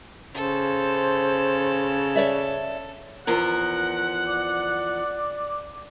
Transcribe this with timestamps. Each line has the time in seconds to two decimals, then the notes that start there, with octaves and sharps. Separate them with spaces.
0.33 C#3 A4 C5
2.16 C#5 D5 E5
3.27 E2 F3 A#4 F#5
4.28 D5